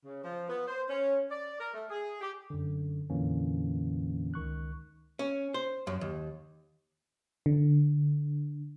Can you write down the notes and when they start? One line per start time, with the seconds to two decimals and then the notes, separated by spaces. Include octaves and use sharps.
0.05 C#3
0.23 F3
0.49 B3
0.68 C5
0.90 C#4
1.31 D5
1.60 A#4
1.74 A3
1.90 G#4
2.21 G4
2.50 F#2 D3
3.10 F2 A#2 D3 E3 A#3 C#4
4.34 C#2 D#3 C#6 F#6
5.19 C#4
5.54 C5
5.87 F#2
6.01 D#2
7.46 D3